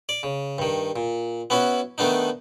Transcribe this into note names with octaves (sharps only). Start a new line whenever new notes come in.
D5
C#3
G2 D#3
A#2
B3 C#4 E4 F#4
D#3 A3 B3 D4 D#4